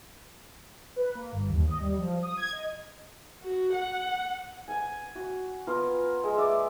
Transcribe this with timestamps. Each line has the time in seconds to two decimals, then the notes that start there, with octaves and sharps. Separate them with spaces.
0.96 B4
1.15 A#3
1.32 G1
1.50 D#2
1.67 D#5
1.80 G3
1.98 F3
2.23 D#6
2.37 G#6
2.53 D#5
3.42 F#4
3.74 F#5
4.68 F#5 G#5
5.15 F#4
5.67 B3 F4 A#4
6.24 G#3
6.37 D5 E5